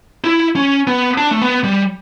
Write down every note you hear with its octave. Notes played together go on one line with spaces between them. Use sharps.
E4
C#4
B3
D4
A3
B3
G3